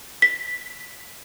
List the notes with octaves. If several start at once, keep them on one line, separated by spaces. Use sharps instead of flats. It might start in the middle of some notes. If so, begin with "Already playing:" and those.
B6